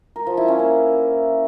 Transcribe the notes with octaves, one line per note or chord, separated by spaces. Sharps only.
A#4
F3
E4
C#4
A#3